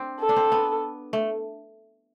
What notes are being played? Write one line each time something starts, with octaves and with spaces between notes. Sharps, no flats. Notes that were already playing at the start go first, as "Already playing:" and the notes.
Already playing: C4 D4
A4
D4
C4
B3
A3